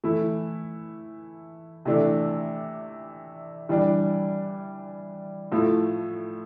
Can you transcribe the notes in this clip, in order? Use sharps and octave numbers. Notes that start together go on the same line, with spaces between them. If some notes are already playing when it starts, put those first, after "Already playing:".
E3 A3 E4
C3 E3 A3 D4
E3 G3 D4
A2 F3 A3 E4